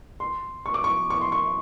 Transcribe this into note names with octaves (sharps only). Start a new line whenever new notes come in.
C6
C#6
D6
C#6
C#6
C6
C#6